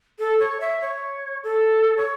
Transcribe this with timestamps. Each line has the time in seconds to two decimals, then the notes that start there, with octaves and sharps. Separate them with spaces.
0.19 A4
0.39 C#5
0.60 E5
0.81 C#5
1.43 A4
1.97 C#5